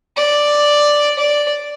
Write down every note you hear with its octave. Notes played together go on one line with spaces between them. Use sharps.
D5
D5